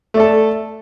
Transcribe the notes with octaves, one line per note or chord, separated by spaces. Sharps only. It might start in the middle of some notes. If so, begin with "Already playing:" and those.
A3 A4 D5